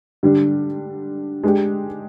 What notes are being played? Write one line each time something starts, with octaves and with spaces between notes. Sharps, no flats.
D3 G3 D4
G#3 D4 G4